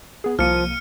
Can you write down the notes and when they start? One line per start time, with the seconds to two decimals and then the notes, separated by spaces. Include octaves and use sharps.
0.24 B3 G#4
0.39 C2 F3 A#3 F6 C#7 D#7